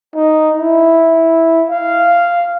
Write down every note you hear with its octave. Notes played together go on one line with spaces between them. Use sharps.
D#4
E4
F5